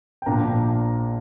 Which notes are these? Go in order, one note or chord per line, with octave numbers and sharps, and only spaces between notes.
G5
A#1 A#2 A#3 D4 A#5